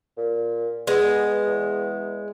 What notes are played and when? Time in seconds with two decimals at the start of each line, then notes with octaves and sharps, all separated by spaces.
0.17 A#2
0.87 G#3 B3
1.46 E2